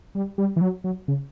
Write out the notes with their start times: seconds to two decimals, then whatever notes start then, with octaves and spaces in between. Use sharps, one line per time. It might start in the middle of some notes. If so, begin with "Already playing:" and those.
0.15 G3
0.38 G3
0.56 E3
0.61 F#3
0.84 F#3
1.08 C#3